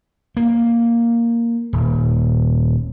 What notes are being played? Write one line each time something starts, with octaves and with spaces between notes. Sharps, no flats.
A#3
D#1